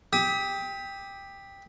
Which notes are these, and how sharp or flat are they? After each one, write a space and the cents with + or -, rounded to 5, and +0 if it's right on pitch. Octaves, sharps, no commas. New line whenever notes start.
G4 +10 D#6 +40